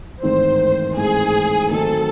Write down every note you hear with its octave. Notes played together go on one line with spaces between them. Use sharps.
A1 G#2 D#3 A3 C4 C5
A1 G#2 D#3 A3 C4 G#4
D#3 F#3 A3 C4 D#4 A4